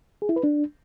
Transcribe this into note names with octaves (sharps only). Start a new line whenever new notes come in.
G#4
E4
B4
D4